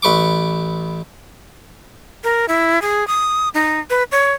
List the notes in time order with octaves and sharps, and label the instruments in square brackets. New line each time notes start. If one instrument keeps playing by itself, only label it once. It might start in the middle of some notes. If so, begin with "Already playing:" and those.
[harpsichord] A1 B4 C#6 D6
[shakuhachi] A#4
E4
G#4
D#6
D#4
B4
C#5